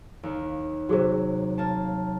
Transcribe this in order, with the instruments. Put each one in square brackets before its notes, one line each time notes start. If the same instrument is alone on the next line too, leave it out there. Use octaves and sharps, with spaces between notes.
[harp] D#2 D#3
[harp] C3 F#3 [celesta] F#4 G#4 C5
[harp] A#3 A5